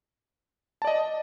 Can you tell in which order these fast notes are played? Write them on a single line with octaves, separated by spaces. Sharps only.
A5 D5 D#5